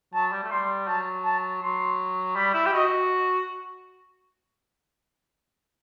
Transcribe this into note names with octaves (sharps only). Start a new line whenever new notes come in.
F#3 A5
G3
A3
G3 C6
F#3 A5
A5
F#3 C6
G3 B5
E4
G4
F#4 D#5